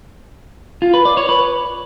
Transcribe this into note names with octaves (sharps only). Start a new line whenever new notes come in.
F4
B4
D5
C#5
B4